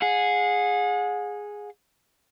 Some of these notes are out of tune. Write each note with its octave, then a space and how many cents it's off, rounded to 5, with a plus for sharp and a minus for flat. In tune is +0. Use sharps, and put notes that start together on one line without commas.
G#4 +0 F#5 -40